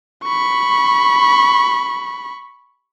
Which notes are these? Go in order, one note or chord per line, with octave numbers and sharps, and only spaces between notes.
B5 C#6